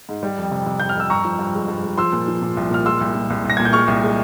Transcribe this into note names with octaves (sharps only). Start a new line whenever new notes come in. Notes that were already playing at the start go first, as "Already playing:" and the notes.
G#2
G3
F2
C3
C3
C3 G6
F6
F2 E6
G2 A#5 C#6
F3
G2
G#3
G2
G#3
F3 C6 E6
A#2
F3
A#2
C2
A#2 F6
G#3 C6 E6
C2
A#2
C2
C2 A#6
A#2 G#6
G6
G#3 C#6 F6
C2
G#3